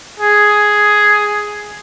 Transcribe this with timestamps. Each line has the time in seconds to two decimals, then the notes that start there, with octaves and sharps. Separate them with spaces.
0.20 G#4